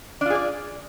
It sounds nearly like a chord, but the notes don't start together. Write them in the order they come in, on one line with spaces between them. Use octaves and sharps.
D4 F4 G#4 D5